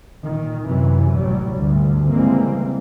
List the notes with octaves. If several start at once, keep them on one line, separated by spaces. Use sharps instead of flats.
A#2 D#3
F#2 C3 E3 F#3
A1 F#3 G3
D2 G2 D3
C#3 E3 G3 G#3 A#3 C4